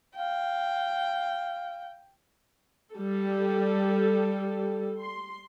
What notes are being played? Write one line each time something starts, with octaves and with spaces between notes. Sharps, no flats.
F5 G5
G3 A4
C6